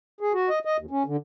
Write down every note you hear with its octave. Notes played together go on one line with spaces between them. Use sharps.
G#4
F#4
D#5
D#5
D#2
C#4
D3